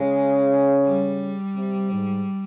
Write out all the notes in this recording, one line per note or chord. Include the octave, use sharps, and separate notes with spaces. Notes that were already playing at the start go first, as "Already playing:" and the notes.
Already playing: C#3 G#3
G3
C3
G#2